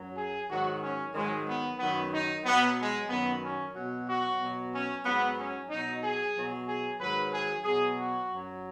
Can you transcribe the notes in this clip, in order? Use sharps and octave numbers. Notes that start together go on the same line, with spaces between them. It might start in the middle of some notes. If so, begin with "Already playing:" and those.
Already playing: F#2 F#3
G#4
G#2 D#3 F#3 F#4
C#4
G#2 D#3 F#3 G#3
B3
F#2 D#3 F#3 B3
D#4
B2 F#3 B3
G#3
F#2 D#3 F#3 B3
C#4
B2 F#3
F#4
B2 F#3
C#4
G#2 F#3 B3
C#4
B2 F#3 D#4
G#4
B2 F#3
G#4
G#2 D#3 F#3 B4
G#4
B2 F#3 G#4
F#4
F#2
F#3